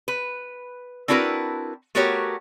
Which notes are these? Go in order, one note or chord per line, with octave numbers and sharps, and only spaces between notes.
B4
C4 D4 E4 F#4 A#4 B4
A3 B3 F#4 G4 A#4 C#5